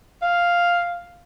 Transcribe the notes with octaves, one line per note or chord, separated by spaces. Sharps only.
F5